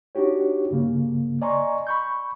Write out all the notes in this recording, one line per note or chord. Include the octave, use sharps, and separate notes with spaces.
D4 D#4 F#4 G4 C#5
G2 C#3 A#3
D5 D#5 G#5 A#5 C6 C#6
B5 C#6 G6